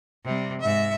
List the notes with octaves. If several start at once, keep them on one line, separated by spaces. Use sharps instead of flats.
C3 G3
G#2 E5